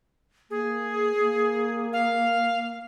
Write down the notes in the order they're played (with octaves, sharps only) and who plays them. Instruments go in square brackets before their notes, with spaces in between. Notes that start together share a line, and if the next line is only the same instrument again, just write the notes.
[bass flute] A#3 [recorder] G#4
[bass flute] A#3
[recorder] F5